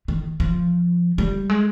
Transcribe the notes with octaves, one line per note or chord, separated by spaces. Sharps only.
D#3
F3
G3
G#3